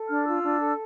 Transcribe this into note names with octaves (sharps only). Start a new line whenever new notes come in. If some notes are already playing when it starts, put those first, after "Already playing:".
Already playing: A4
D4 F6
F4 E6
D4
A4